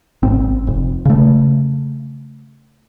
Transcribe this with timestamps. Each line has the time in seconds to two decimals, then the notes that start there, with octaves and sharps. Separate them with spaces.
0.23 G#1 C4
0.67 F1
1.05 C#3 A3